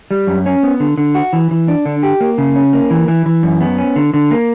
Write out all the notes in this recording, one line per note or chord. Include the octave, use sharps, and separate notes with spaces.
G3
F#2
C#4
B3
D3
D3
F#4
E3
E3
D4
D3
G4
A#3
C#3
C#4
A#3
E3
E3
E3
F#2
B3
C#4
D3
D3
A#3